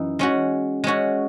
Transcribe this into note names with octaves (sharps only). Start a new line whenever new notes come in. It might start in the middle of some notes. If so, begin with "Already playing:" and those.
Already playing: F#2 E3 D#4
G#3 C#4 F#4
G#3 C#4 F#4